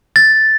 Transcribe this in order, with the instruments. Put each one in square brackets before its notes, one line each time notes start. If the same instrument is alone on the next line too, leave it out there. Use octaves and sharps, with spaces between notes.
[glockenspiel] A6